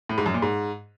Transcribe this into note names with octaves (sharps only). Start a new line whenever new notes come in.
A2
G#2
F#2
A#2
G#2